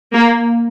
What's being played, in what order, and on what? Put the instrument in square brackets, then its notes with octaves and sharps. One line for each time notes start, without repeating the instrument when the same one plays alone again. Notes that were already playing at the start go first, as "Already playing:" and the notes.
[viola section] A#3